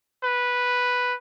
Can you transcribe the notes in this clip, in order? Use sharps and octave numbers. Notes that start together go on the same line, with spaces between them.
B4